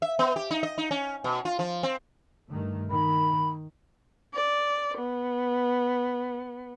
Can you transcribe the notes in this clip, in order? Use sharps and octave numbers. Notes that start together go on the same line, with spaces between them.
E5
B3
G4
D#4
D#5
D#4
C#4
B2
F4
F3
C4
G2 D#3 A3
D#3 B5
D5
B3